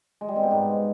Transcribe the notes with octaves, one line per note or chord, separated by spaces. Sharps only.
G#3
G3
C4
B2
G#2